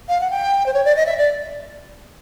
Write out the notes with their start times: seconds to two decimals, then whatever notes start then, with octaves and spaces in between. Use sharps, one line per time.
0.09 F5
0.21 F#5
0.31 G5
0.66 C5
0.74 C#5
0.85 D5
0.96 D#5
1.06 E5
1.18 D5